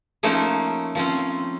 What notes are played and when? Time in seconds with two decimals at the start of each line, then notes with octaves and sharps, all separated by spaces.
0.23 F3 A3 A#3 C#4 D#4
0.95 F3 C4 C#4